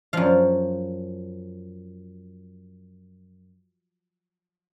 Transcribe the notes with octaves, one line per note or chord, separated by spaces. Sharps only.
F#2 F3 F5